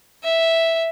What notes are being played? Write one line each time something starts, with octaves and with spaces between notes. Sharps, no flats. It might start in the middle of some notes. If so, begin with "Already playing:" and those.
E5